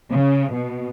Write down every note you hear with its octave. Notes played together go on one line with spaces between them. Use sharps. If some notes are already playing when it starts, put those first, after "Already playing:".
C#3
B2